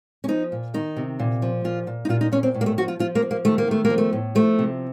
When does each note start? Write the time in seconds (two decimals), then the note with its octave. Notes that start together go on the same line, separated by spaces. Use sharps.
0.24 C#4
0.28 F3 D#4
0.52 A#2
0.74 D#3 D#4
0.97 C3
1.19 A#2
1.42 F3
1.64 A#2 F4
1.87 A#2
2.05 D#4
2.09 A#2 F4
2.21 D#4
2.32 A#2 C#4
2.43 C4
2.54 A2
2.61 A#3
2.66 A3
2.78 F3 F#4
2.88 F4
2.99 F3 F4
3.15 A#3
3.22 F3
3.31 A#3
3.45 D#3 A3
3.58 A#3
3.67 D#3 A3
3.85 A#3
3.90 F3
3.98 A3
4.13 A2
4.35 F3 A3
4.59 C3